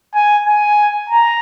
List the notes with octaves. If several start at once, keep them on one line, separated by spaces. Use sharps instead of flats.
G#5
G#5
A#5